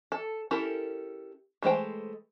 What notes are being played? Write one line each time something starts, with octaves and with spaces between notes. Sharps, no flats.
A4
C#4 E4 G4 A4 A#4
E3 G#3 A3 C5 G5